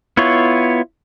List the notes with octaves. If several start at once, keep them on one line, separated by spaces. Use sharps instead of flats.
B3 E4 F4 C#5